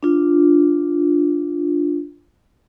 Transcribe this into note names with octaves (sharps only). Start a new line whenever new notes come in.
D4 F4